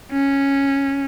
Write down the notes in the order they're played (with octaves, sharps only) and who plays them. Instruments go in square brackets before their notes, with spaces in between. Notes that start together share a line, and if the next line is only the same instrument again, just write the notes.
[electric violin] C#4